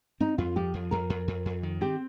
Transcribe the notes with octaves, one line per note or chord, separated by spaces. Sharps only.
C4 D#4
F2 F4
F3 G4
F2
F2 A#4
F2
F2
F2
D#3
C4 G4